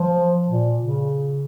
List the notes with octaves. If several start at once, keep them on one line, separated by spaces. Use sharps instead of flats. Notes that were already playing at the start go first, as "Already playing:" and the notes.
Already playing: F3
A#2
C#3